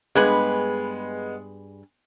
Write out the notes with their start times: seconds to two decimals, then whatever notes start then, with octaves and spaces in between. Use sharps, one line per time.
0.15 G2 G#3 B3 G#4 B4